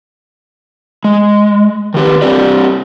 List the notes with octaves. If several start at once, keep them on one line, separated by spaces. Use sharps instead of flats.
G#3
D#3 G4 B4
G3 C4 D4 G4 D5